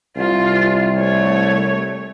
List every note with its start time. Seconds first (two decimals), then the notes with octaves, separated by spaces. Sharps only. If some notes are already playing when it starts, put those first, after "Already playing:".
0.17 C2 F4
0.98 A3 C#5